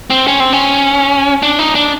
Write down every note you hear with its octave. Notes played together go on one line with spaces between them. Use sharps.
C4
C#4
C4
C#4
D4
D#4
D4